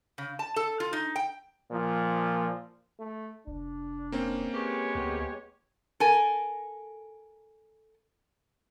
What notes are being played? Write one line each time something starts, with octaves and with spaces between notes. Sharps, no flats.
C#3
A5
A4
F4
D#4
G5
A#2 F3
A3
F1 D4
A#3 C4 C#4
G#3 G4 B4 C#5
D2 B3
A4 A#4 G#5